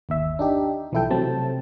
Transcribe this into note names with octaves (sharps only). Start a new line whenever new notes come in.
G1 D#2 E5
D4 D#4 G4
B1 E3 F3 E4 A4 G5
C3 F#3 A3 C4 A5